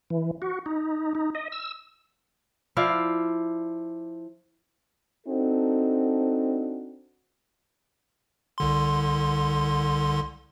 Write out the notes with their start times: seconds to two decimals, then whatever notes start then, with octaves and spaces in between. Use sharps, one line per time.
0.10 E3
0.42 F#4
0.66 D#4
1.15 D#4
1.35 D#5
1.52 E6
2.77 F3 E4 D5 F5
5.27 C4 D4 D#4 F#4 A4
8.58 C2 D3 C6